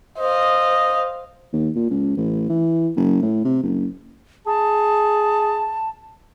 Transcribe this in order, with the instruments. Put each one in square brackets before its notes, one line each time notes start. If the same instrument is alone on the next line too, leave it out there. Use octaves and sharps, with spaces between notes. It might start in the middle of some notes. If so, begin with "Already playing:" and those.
[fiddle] C5 F5 [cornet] D#5
[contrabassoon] D#2
A#2
C#2
A1
E3
F#1
A2
C3
F#1
[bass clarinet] G#4 [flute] A5